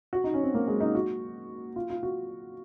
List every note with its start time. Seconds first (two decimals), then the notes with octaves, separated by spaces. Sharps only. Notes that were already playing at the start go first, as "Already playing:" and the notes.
0.13 F#4
0.24 D#4
0.34 C#4
0.43 C4
0.54 A#3
0.67 G#3
0.80 D#4
0.95 F#4
1.76 F4
1.90 F4
2.03 F#4